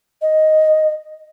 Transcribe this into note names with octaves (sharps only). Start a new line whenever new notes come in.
D#5